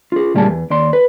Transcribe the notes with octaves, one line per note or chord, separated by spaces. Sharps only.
F4 G#4
D2 A#2 G3 G#4 A#4 A5
E2
D#2 D5 C6
B4